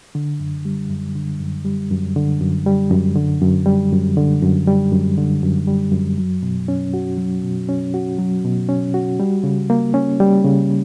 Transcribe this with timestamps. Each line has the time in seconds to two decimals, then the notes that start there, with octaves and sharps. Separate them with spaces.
0.15 D3
0.40 F#2
0.65 G3
0.90 F#2
1.15 D3
1.40 F#2
1.65 G3
1.90 F#2
2.16 D3
2.41 F#2
2.66 G3
2.90 F#2
3.16 D3
3.42 F#2
3.66 G3
3.92 F#2
4.17 D3
4.42 F#2
4.67 G3
4.92 F#2
5.18 D3
5.43 F#2
5.68 G3
5.92 F#2
6.18 F#3
6.43 B2
6.68 C#4
6.94 F#4
7.18 F#3
7.43 B2
7.69 C#4
7.94 F#4
8.18 F#3
8.44 B2
8.69 C#4
8.94 F#4
9.20 G3
9.44 C#3
9.70 A#3
9.94 C#4
10.20 G3
10.44 C#3